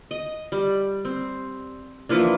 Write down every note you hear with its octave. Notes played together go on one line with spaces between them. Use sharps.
D#5
G3
C4
E3 F3 A#3 D4